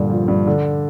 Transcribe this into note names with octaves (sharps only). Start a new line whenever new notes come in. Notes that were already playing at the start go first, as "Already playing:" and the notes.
Already playing: G2 A#2 D3
F3
G2
D3